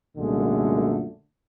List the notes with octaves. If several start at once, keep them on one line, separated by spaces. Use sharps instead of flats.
C2 F#2 A#2 D3 G#3 A3